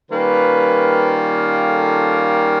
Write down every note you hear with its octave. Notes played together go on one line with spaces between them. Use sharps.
D#3 G3 A#3 C#4 F4 B4
A4